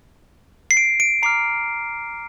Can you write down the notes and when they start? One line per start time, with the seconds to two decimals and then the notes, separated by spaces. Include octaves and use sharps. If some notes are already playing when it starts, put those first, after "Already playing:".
0.71 C7
0.77 D7
1.00 D7
1.23 A#5 D6 F6 C7